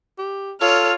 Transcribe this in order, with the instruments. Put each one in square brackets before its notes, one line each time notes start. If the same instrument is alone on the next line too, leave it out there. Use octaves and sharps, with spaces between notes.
[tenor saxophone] G4
[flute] F4 [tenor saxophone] A4 [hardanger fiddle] C#5 [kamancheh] F6